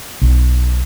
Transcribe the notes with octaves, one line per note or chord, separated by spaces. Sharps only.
B1